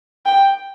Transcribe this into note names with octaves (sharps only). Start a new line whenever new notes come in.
G5